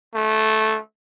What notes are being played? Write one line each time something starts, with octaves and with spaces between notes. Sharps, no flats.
A3